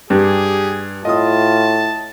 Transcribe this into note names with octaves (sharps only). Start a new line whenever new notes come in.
G2 G4 G#4
A2 F4 D#5 A5 D#6